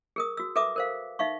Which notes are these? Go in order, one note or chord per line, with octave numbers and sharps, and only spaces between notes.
G#4 A#4 D#6
F#4 E6
A4 B4 E5 D6 D#6
A#4 C5 F5
D#4 E5 F5 C#6